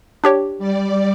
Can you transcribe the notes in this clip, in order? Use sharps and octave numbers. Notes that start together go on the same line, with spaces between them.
D4 G4 C#5
G3 D5